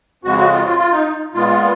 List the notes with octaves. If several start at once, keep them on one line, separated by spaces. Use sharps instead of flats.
F2 C#3 G#3 F#4
F#4
F4
F4
F4
D#4
A#2 G#3 B3 F4